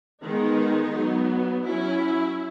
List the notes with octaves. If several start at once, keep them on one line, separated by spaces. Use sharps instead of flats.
D#3 G#3 B3 D#4
F#3 B3
F#3 C#4 E4